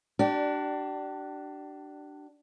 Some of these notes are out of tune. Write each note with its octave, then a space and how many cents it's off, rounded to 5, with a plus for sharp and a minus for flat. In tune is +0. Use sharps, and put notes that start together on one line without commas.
D4 +10 G4 -40 D5 +0